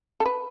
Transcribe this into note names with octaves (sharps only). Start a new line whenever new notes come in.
A4
B4